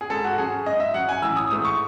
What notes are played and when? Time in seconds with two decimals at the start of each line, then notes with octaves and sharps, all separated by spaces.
0.01 G#4
0.10 G#2 A4
0.24 F#4
0.38 F#3 C#4 G#4
0.66 G#2 D#5
0.80 E5
0.94 F#3 C#4 F#5
1.09 G#5
1.22 A1 E6
1.37 D#6
1.51 G#2 E3 A3 D#6
1.65 C#6